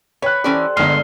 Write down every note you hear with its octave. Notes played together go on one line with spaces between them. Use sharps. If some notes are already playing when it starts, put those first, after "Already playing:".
B4 C#5 G5 F#6
E3 G3 C#4 A4 C5 D5
G1 G#3 D5 C6 F6